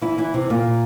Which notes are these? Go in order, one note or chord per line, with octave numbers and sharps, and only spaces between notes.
E3 E4
E3 E4
C3 C4
A#2 A#3